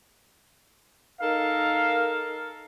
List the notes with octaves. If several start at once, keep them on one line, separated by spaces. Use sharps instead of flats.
D#4 A4 A#4 F5